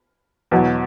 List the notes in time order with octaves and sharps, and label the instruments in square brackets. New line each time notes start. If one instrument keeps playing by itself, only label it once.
[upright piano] E2 B2 F#3